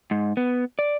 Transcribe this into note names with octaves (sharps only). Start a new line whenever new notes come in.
G#2
B3
D5